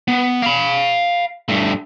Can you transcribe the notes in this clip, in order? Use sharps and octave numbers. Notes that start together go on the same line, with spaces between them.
B3
F5 B5
G2 A3